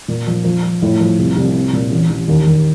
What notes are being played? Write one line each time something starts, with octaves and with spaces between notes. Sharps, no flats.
A#2
F3
F3
F3
A2
F3
C2
C2
C4
A#2
A1
A1
D#2
D#2